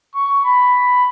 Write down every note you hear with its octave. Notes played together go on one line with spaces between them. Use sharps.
C#6
B5